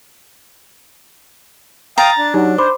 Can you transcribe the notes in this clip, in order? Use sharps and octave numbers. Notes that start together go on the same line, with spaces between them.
F5 G5 A#5 D#6 A6
D4
F#3 D#4 G4
C5 B5 D6